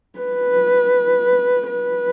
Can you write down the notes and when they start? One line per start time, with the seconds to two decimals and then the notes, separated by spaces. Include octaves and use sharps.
0.19 B4
1.67 B4